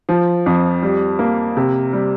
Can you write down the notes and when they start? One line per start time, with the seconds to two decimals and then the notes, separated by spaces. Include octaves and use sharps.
0.09 F3
0.46 F2
0.83 G3
1.19 A#3
1.57 C3
1.93 G3